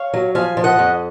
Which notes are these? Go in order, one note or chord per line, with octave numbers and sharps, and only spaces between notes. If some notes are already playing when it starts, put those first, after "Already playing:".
Already playing: C#5 F5
F#3
F3 F5 G#5
F3
D#5 F#5
F2